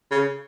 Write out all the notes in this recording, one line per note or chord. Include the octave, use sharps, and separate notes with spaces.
C#3